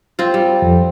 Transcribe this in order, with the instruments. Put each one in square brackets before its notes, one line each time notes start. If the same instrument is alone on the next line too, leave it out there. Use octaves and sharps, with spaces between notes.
[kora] C4 F4
G3
[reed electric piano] F2